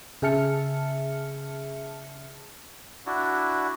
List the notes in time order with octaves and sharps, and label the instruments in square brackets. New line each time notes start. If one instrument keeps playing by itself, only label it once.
[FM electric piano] C#3 G#4 E5 A5 F6 C#7
[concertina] D4 E4 F#4